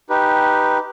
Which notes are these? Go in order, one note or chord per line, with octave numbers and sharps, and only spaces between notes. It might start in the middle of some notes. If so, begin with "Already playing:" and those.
D#4 G4 B4